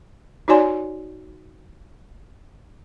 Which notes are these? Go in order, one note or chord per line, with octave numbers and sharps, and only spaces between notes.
D#4 F#4 C#5 D5 G#5 C6